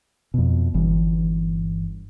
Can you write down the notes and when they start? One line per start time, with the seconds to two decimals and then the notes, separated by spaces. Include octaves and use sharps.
0.34 F2 B2
0.74 G1 G2 E3